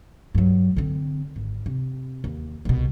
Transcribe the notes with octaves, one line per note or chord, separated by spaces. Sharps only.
G2 F#3
D3 C4
G#1
C3
D#2
C2 B2